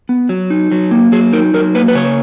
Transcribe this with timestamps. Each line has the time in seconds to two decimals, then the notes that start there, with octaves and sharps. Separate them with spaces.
0.09 B3
0.29 F#3
0.50 D#4
0.71 F#3
0.91 A#3
1.12 F#3 G#4
1.33 D#4 A#4
1.54 F#3 A#4
1.75 A#3 B4
1.88 B4
1.95 C#3 C#5